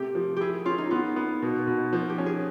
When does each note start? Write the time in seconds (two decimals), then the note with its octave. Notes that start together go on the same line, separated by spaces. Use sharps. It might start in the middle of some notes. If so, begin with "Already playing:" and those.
Already playing: C3 A3 G4
0.15 F3
0.36 E4 G4 G#4
0.65 C#4 F4
0.78 D#4
0.91 B3 F4
1.16 B3
1.42 B2
1.67 B2
1.93 F3
2.09 G4
2.18 C#4
2.26 G#4